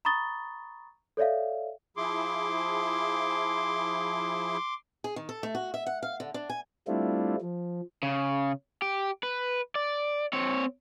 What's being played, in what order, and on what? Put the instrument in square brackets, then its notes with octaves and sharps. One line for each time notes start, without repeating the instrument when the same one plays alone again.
[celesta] A#5 B5 C#6 D#6 A6 G7
A4 C#5 D5 E5 F5
[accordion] F3 E4 G#4 [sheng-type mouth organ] C6 D6
[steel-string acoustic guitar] G#4
D#3
A4
A3
F#4
E5
F#5
F5
D3
D4
G#5
[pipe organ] G3 A3 C4 D4 E4 F4
F3
[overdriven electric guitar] C#3
G4
B4
D5
C4 C#5